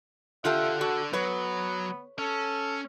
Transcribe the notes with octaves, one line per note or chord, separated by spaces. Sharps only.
D3 F4 G4 A4 E5 F#5
F#4 A4
F#3 B3 B4 C#5
C#4 A4